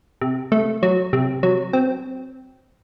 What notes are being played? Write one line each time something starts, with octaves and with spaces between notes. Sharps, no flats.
C3
A3
F#3
C3
F#3
C4